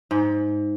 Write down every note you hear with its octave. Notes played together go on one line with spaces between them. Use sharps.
G#2